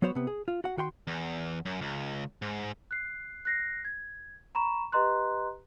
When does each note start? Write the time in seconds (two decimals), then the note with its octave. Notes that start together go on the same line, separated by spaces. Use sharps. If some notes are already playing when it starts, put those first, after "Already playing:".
0.02 F#3 B3 F#4 C5 C#5 F#5
0.15 C3 B3
0.27 G#4
0.48 F4
0.64 F#4 F#5
0.77 D#3 F#4 G5 C6
1.07 E2
1.65 F#2
1.81 C#2
2.42 G#2
2.91 F#6 C7
3.45 F#6 A#6 C7
3.85 G#6
4.55 A#5 B5 C#6 E7
4.92 G4 B4 D#5 A#5 C6 F#6